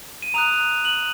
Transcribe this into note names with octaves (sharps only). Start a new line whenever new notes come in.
D#7
A#5 D#6 F#6 F7
F#7